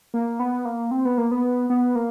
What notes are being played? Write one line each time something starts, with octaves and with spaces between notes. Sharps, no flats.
A#3
B3
A#3
C4
B3
A#3
B3
B3
A#3